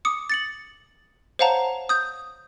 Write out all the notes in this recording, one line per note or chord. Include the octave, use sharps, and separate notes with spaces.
D6 D#6 C#7
A6 C#7 F#7
C5 C#5 F5 F#5 A5 A#5
D#6 G6